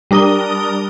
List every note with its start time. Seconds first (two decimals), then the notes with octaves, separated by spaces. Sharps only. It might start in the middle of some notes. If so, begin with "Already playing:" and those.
0.11 G3 D4 A#4 D#6 G7